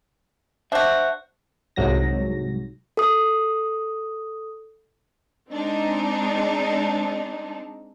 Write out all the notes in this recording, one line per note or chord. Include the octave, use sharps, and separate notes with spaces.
D4 F#4 C5 E5
C2 G#2 F#3 A#6
A4 D#6
G#3 C4 D4 D#4